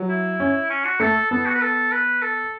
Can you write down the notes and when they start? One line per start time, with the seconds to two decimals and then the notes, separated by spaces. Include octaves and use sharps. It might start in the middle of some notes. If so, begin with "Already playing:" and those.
Already playing: F#3
0.09 E4
0.40 C#4
0.70 C#4
0.85 F#4
1.00 A3 A4
1.31 B3 A4
1.46 F#4
1.55 B4
1.62 A4
1.92 B4
2.22 A4